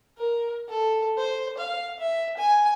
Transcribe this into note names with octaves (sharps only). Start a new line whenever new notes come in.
A#4
A4
C5
F5
E5
G#5